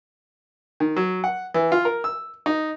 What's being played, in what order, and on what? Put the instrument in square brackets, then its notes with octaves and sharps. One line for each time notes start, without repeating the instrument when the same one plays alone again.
[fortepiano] D#3
F#3
F#5
E3
F4
A#4
E6
D#4